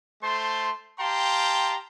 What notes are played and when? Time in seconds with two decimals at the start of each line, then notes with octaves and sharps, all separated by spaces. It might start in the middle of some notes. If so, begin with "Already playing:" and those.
0.22 A3 C5 A5 C6
1.00 G4 F5 G5 A5 A#5 C6